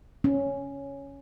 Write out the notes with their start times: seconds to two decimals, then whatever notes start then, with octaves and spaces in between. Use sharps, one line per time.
0.24 C#4